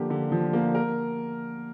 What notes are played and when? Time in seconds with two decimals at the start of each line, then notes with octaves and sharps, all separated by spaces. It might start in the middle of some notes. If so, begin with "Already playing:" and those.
Already playing: D3 F3 A#3 G4
0.10 D3
0.32 F3
0.53 A#3
0.75 A#4